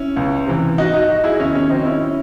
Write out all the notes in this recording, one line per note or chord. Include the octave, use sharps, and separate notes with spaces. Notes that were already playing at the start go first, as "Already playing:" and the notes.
Already playing: C#4 E4
C#2
C3 E3
G#2 D#4 F#4
D#4 F#4
F#3 D#4 F#4
E4 G#4
D#4
D#2 C#4 E4
C#4
D#3 F#3 C4 D#4
C#4 E4